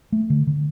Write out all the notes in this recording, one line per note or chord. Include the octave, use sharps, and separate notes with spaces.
A3
D3
D3